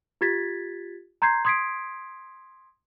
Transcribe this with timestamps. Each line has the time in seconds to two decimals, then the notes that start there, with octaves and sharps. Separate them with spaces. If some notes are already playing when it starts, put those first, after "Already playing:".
0.21 F4 G4 G#6 A6 B6
1.22 A#5 C6 G6 G#6 C7
1.45 C6 D#6 G#6 B6 C7 D7